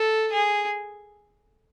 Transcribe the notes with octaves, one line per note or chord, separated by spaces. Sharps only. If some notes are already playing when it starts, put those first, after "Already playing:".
Already playing: A4
G#4